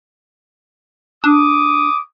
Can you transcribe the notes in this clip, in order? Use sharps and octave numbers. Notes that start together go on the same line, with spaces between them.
D4 D6 D#6